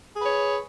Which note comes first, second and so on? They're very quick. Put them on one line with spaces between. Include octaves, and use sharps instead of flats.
G#4 B4 C#5